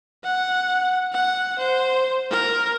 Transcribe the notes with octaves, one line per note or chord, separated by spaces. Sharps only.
F#5
F#5
C5
A#4